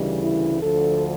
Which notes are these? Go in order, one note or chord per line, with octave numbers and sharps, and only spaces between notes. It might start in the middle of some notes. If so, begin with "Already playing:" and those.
Already playing: D2 C#3 E3 G3 D#4
E4
D2 D3 F3 A4